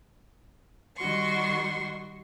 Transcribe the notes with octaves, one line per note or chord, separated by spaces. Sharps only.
D#3 G3 F#4 C6 C#6